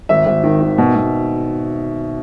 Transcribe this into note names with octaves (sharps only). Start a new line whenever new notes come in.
G#1 E5
G#1
D#3
D#3
B2
B2